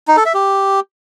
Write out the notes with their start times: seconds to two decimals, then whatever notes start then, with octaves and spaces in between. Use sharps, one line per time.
0.08 D#4
0.17 A4
0.26 E5
0.34 G4